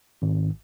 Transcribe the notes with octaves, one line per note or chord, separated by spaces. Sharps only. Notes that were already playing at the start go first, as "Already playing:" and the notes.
G#1